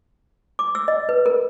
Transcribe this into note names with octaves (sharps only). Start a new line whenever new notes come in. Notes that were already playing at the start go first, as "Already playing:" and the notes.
D6
E6
D#5
B4
A#4